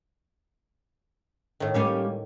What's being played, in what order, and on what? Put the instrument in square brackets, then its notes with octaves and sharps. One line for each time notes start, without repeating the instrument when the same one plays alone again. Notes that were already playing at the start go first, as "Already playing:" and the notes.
[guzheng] A2 D#3
[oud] G3 A#3 C#4